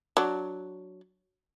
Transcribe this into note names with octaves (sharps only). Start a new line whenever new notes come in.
F#3 D4